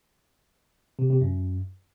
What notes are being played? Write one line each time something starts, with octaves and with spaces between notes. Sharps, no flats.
C3
C3
F#2